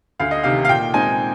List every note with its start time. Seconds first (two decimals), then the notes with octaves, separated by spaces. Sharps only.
0.20 D2 F5
0.31 D#5
0.44 C3 D#3 F5
0.65 F5
0.69 A#2 G5
0.94 G#3 C4 D#4 G#5